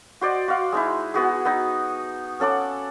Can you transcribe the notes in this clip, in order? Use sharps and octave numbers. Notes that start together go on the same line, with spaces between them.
F#4 C5 D5 D#5
F#4 F5
G#3 D#4 E4
B3 F#4 G#4
B3 D#4
C#4 A4 F#5 D6